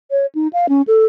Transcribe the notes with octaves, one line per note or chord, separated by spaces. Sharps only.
C#5
D#4
F5
C#4
A4